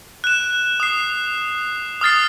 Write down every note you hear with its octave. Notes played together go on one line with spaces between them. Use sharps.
F#6 E7
D#6 C7
D#6 F6 A6 C7